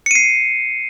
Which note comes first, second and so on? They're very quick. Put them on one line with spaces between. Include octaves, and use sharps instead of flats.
C#7 D#7 C7